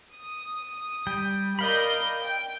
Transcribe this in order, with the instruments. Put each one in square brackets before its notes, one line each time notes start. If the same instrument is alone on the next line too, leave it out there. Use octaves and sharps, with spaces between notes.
[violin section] D#6
[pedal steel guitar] G3 G5
[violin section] A#4 D#5 G6 [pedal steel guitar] D5 F5 B5
[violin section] G5